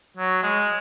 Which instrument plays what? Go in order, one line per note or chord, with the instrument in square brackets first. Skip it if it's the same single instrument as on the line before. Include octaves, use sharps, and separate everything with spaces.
[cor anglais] F#3
G#3